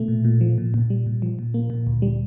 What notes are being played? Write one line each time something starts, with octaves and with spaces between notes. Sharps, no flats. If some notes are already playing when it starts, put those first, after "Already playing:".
Already playing: B2 A3
A#2
A#2
F3
A#2
A#2
G3
A#2
F3
A#2
A#3
A#2
D2
G3